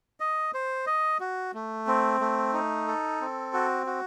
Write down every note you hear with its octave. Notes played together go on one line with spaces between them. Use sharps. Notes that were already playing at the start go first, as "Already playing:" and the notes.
D#5
C5
D#5
F#4
A3
C4
A3
D#4
A4
C4
F#4
F#4